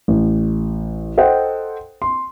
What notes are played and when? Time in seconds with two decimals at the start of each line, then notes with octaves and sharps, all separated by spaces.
0.08 A1
1.18 A4 C5 D#5 F#5 G5
2.02 C6